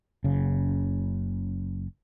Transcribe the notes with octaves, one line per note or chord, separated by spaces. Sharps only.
F#1 C#3